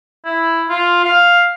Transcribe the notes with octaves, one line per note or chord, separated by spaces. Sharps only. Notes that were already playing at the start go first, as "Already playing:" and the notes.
E4
F4
F5